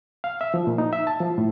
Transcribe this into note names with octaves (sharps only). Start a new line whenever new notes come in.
F5
E5
F3
A#2
D#4
E5
A5
F3
A2